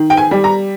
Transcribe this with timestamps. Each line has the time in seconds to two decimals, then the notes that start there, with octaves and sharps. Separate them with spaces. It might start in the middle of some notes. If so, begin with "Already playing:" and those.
Already playing: D#3
0.10 G5
0.17 G#5
0.31 G3
0.44 A#5